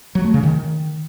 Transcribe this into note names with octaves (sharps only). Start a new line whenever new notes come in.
F#3
A3
C#3
D#3